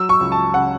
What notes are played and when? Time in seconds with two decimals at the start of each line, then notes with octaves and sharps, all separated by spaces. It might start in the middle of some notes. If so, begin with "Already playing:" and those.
Already playing: F#3 E6
0.09 C#6
0.21 C#2
0.32 A5
0.54 C#3 F#5